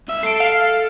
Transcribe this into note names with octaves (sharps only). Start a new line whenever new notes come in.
C2 E5
A4 C7 D7
F5